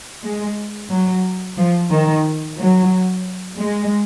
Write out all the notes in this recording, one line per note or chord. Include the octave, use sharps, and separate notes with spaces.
G#3
F#3
F3
D#3
F#3
G#3